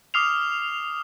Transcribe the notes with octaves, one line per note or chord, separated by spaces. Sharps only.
D6 D#6 F6 C7 F7